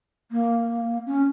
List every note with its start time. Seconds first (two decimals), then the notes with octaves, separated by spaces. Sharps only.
0.31 A#3
1.06 C#4